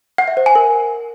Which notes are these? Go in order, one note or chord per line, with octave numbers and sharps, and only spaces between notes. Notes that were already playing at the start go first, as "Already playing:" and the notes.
F#5
E5
C5
G#5
A#4